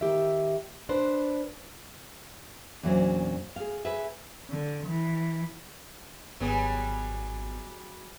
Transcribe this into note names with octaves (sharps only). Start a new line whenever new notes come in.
D#3 G4 E5
D4 B4 C5
E2 A#2 F#3 C#4 D4 C5
G#4 F5
G#4 B4 E5
D3
E3
G#1 F#3 G3 B3 G#4